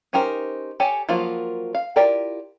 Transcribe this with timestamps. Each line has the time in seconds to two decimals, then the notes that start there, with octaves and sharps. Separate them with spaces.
0.13 C#4 D#4 G4 A#4 C5
0.80 G4 A4 C#5 G#5
1.09 F3 F#3 A#3 F4
1.75 F5
1.96 E4 F4 G4 A#4 D5